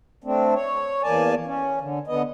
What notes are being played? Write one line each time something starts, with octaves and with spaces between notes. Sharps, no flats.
A3 C4 D4
C#5
E2 A#3 D5 G#5 A5
C#4
D3
D3 B3 D#5